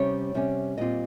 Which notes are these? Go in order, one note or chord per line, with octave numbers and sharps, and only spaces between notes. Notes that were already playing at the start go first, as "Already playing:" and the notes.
Already playing: C3 G3 C#4 C#5
C3 G3 C#4
A#2 G3 C4 F4 D#5